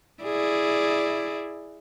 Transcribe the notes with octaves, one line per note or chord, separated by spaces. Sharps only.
E4 G#4 D5